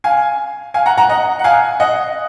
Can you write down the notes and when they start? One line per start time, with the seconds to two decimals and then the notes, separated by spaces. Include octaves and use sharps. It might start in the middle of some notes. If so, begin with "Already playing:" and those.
0.04 F5 G#5
0.74 F5 G#5
0.86 F#5 A#5
0.98 F#5 A#5
1.09 D#5 F#5
1.39 F#5
1.44 F5 G#5
1.80 D#5 F#5